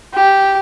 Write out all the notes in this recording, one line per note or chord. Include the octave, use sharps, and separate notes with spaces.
G4